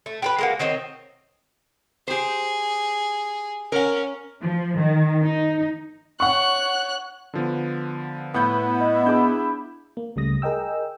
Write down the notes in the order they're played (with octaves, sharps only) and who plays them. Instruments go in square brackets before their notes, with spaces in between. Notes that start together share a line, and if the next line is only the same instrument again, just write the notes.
[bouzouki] A3
G4 A#4 B4
G#3 A#3 F#4
D#3 C4 C#5 D#5
[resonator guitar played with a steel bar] G4 C5 [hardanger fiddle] G#4
[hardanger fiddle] C#4 [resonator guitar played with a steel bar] A#4 F#5
[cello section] F3
D#3
D#4
[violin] C#5 F#6 [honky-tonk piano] F#5 C#6
[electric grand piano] D3 F3 B3
[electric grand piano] A2 F#5 G6 [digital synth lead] B3 [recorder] E4
[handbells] D#5
[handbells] D4 G#4 B5 [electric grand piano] D6 G6
[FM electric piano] A#3
C#2 C#3 G3 A3 D#6 A#6
G#4 A#4 D#5 G5 E6